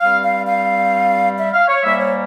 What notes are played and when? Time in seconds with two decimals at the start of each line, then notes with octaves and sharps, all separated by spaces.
0.01 G2 G3 C4 F5
0.23 F5
0.46 F5
1.38 E5
1.53 F5
1.68 C#5
1.83 G#2 G3 A#3 E5
1.98 C#5